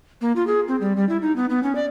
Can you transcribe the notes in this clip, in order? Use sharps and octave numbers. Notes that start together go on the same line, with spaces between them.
A#3
F4
G#4
C4
G3
G3
E4
D#4
B3
B3
C#4
D5